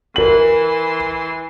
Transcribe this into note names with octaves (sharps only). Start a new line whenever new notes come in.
E3 A#4 C6 F#7